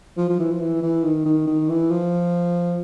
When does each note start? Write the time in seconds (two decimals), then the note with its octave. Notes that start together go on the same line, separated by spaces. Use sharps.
0.17 F3
0.29 F3
0.39 E3
0.51 F3
0.61 E3
0.82 E3
1.04 D#3
1.25 D#3
1.47 D#3
1.69 E3
1.91 F3